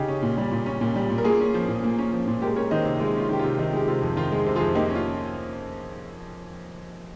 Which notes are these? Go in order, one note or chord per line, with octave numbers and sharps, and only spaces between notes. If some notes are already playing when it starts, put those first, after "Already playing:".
Already playing: C#3 D#4 G4
C#4
A#2
G3
A#2
C#4
A#2
G3
A#2
A#4
A#3 F4 G#4
C#4
F3
A#2
A#3
C#4
F3
A#2
G#3 G4 A#4
C#4 A#4 C#5
D#3 C5 D#5
C3
G#3 F4
C#4 F4
D#3 G4
F4
C3
D#3 D#4
G#3 G4
C3 F4
F2
D#3 F4
G#3
C3
F4 G#4
F2
A#3 D#4 G4
C#4
F4